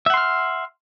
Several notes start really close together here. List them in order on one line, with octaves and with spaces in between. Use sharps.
E5 F#5 C6 F6